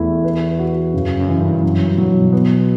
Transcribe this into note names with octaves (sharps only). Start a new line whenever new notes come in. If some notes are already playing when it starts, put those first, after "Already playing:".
Already playing: E2 A3 E4
B4
F#4
F#2 C#3
F#2
E3
G2
F#2 F#3
G2
F#3
B2
B3